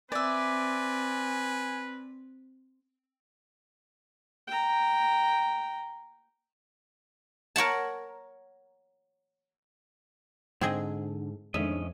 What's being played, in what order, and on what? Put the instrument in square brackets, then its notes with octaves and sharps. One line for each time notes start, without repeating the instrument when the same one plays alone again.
[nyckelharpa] C4 [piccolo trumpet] B4 [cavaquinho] D5 E5 [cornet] G#5
[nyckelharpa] G5 A#5
[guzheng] A#4 C#5 F#5 A5
[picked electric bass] G#2 [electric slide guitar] D3 [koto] C4 G#4 D#5
[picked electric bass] F2 [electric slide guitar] A2 C#4 D#5 [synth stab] D3 D#3 G#3 [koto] E5